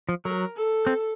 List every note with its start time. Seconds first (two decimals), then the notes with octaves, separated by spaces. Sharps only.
0.09 F3
0.25 F#3 A#4
0.56 A4
0.87 C4